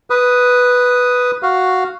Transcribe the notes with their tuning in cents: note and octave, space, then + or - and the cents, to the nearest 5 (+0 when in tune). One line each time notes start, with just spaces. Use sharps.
B4 +0 D#6 +0
F#4 +0 F5 +0